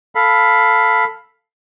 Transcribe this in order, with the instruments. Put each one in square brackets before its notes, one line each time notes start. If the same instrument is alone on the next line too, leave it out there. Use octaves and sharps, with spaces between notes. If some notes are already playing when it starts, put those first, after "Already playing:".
[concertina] A4 F5 B5